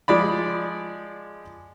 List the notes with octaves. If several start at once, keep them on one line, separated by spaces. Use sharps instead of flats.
F3 G#3 D5 B5